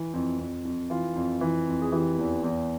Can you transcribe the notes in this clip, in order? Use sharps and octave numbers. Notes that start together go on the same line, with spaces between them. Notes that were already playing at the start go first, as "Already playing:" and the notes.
Already playing: E3
F2
F2
F2
E3 F4
F2
E3
F2
G#4
E3 G4
E2
E2